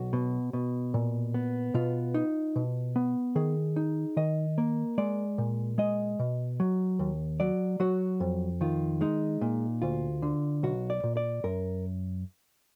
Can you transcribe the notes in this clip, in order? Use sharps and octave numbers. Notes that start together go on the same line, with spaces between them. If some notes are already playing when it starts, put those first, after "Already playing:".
Already playing: B1 F#4
B2
B2
A#2
B3
B2 F4
D#4
B2
B3
D#3 G#4
D#4
D#3 D#5
A#3
G#3 D5
A#2
G#3 D#5
B2
F#3
D#2
F#3 D5
F#3 F#4
F2
D#3 F4
G#3 D#4
A#2
D2 F4
D3
B1 F#4
D5
A#2
D5
F#2 A#4